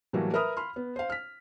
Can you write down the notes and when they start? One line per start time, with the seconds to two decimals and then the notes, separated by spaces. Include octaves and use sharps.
0.13 A2 E3 F#3 G3 A3 A#3
0.34 A#4 B4 E5 B5 D#6 F6
0.57 B5 C6 F6
0.76 B3
0.96 C5 F5
1.10 F6 B6